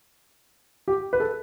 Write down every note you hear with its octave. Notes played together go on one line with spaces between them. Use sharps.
G4
B4
A4